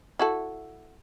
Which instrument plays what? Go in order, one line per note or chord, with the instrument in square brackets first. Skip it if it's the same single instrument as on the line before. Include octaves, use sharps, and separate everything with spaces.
[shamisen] E4 F#4 A4